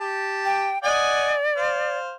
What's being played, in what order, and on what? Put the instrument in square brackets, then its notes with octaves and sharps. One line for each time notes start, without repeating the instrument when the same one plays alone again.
[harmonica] G4 A5
[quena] G5
[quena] D5 [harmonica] D#5 F#5 G#5
[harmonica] C5 F5